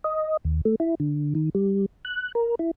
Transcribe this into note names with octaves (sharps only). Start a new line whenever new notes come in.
D#5
D#2
A3
E4
D3
D#3
G3
F#6
A#4
E4